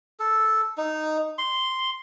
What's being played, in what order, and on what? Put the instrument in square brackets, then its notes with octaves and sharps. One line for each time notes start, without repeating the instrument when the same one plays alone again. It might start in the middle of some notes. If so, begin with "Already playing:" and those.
[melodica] A4
D#4
C6